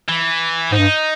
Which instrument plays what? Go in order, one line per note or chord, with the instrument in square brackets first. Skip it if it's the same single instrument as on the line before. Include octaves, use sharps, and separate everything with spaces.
[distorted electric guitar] E3
[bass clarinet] G#2 [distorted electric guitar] D#4
[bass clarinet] G2